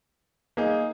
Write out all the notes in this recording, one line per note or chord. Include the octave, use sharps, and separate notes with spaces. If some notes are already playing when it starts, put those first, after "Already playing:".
A#3 D#4 G#4